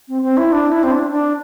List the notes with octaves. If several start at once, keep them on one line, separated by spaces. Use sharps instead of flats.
C4
C4
E4
D4
E4
C4
D4
D4